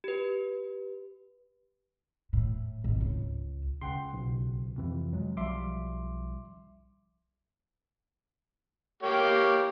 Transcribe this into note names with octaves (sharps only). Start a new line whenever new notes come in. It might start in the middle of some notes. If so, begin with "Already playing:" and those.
G4 B4
A2
G#1
C#2
C#2 C#3 F#5 G5 C6
B1
F2 C3 E3
F#3 G#3
B1 F3 G3 E5 C6 D6
A#3 G4 C#5